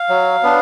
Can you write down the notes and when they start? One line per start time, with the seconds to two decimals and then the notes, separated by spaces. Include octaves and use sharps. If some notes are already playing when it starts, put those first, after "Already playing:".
Already playing: F5
0.09 F#3
0.43 B3 D4